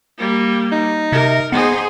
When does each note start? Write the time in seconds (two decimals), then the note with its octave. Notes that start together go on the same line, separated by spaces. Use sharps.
0.18 G3 A#3
0.72 D#4
1.12 C3 A#4
1.52 B3 D#4 G#4 C5